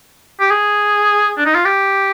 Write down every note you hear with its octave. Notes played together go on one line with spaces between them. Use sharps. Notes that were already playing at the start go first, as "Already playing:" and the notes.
G4
G#4
D4
D#4
F4
G4